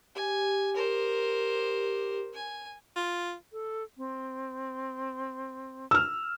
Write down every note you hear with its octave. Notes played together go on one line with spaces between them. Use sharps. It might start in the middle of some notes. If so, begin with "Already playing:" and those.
G4 G#5
A#4 C5
G#5
F4
A4
C4
E6 F6